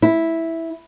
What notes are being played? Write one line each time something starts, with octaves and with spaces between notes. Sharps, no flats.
E4